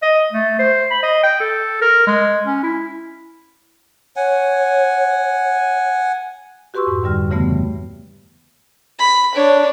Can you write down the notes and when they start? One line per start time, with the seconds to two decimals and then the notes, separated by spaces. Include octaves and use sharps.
0.03 D#5
0.33 A3
0.59 C5
0.91 B5
1.03 D#5
1.23 G5
1.40 A4
1.82 A#4
2.07 G#3
2.47 C#4
2.63 E4
4.16 C#5 F#5 G#5
6.74 F#4 G4 B4 C6 C#6 E6
6.87 F2 G#2
7.03 D#2 D3 G3 F6
7.31 C#3 E3 G3 A3 B3
8.99 B5
9.34 D4 C#5